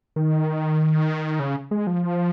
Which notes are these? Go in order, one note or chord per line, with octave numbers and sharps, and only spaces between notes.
D#3
C#3
G#3
F3